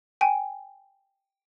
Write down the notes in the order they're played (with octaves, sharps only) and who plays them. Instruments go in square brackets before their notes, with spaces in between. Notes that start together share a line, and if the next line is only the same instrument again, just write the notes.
[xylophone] G5 G#5